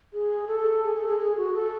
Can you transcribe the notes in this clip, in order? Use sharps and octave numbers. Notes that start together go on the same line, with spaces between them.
G#4
A4
G#4
A4
G#4
G#4
F#4
A4